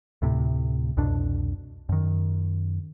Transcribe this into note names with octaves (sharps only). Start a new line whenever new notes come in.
D2 A2 C3
C2 F2 B2 D4
F#2 D#3